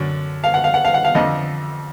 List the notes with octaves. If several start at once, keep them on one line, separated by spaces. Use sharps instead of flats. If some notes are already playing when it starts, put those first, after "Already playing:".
Already playing: F#2 D3
F5
F#5
F5
F#5
F5
F#5
F5
F2 D3 F3 D#5